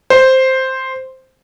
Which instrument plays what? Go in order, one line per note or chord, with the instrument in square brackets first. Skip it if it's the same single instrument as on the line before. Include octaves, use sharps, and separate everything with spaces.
[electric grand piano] C5